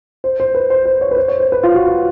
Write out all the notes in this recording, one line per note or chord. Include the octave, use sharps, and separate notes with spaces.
C5
C5
B4
C5
C5
C#5
B4
C5
C#5
C5
B4
F4
F#4
F#4